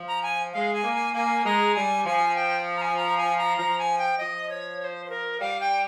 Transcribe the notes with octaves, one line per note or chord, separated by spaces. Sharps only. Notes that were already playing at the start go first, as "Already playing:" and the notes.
Already playing: F3
A#5
G#5
G#3 F5
G#5
A#3
G#5
A#3 G#5
G#3 A#5
G3 G#5
F3 G#5
G5
A#5
G#5
A#5
G#5
A#5
F3 A#5
G#5
G5
F3 D#5
C#5
C#5
C5
C5
A#4
G3 F5
G5